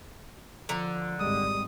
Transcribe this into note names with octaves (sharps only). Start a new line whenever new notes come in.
D3 F3 A#5
G#1 G3 G#3 D#6